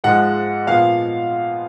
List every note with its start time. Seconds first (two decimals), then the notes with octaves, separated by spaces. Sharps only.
0.04 G#2 F3 G#3 F#5
0.67 A#2 F3 B3 F5